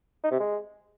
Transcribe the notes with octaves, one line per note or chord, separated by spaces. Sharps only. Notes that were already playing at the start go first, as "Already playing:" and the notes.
D#4
C3
G#3